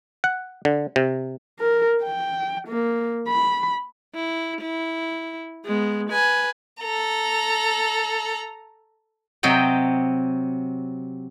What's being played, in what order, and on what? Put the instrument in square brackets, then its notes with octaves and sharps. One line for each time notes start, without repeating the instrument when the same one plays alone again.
[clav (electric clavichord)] F#5
D3
C3
[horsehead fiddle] A#4
G5
A#3
B5
[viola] E4
E4
G#3 B3
B4 G#5
[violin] A4 A#5
[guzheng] C3 F#3 D#5 G5